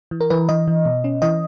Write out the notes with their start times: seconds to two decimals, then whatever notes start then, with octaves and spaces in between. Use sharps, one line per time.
0.11 E3
0.21 A#4
0.30 E3 B4
0.49 E3 D#5
0.68 E3
0.85 B2
1.04 C#4
1.22 E3 D#5